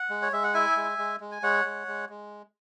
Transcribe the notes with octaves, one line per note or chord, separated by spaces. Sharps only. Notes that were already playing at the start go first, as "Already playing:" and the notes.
Already playing: F#5
G#3
C#5
G#3 E5
F#5
E4 E5 G#5
G#3
G#3
G#3
G#5
G#3 C#5 F#5
G#3
G#3
G#3